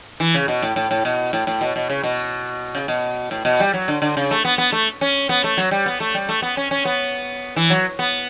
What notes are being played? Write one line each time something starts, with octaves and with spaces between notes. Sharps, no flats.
E3
C#3
B2
A2
A2
A2
B2
A2
A2
B2
B2
C#3
B2
C#3
B2
A2
B2
G3
F#3
D3
D3
C#3
A3
B3
B3
A3
C#4
B3
A3
F#3
G3
B3
A3
G3
A3
B3
C#4
C#4
B3
E3
F#3
B3